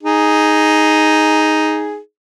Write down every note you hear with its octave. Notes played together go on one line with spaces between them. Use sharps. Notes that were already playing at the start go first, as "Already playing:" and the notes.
D#4 G#4